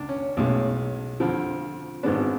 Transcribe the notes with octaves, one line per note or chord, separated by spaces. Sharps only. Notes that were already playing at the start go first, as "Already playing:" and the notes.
Already playing: C#2 D4
C#4
B1 A2 G#3 C#4
F2 D3 F3
G#1 G#2 G#3 B3 D4